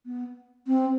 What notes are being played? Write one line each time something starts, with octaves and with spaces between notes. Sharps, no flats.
B3
C4